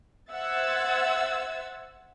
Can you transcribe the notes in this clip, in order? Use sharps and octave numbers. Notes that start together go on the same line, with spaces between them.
C5 E5 F#5 E6 G#6 A6